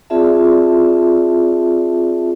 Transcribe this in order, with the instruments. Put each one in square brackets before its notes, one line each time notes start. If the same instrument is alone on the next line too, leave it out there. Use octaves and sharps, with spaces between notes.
[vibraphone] C4 F4 G#4 D5 E5 A5